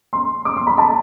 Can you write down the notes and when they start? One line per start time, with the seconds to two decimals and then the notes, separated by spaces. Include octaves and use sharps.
0.13 C6
0.45 D6
0.57 C6
0.67 B5
0.78 A5